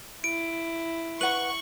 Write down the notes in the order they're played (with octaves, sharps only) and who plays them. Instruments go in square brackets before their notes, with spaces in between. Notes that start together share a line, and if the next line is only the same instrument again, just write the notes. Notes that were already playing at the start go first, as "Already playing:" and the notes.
[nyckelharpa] E4 [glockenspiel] D7
[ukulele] B4 F#5 [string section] C#6 [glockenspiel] F#7